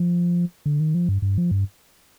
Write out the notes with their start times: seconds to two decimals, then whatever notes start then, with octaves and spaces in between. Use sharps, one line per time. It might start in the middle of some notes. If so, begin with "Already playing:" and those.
Already playing: F3
0.66 D3
0.80 D#3
0.95 F3
1.09 G2
1.22 G2
1.38 F3
1.51 G2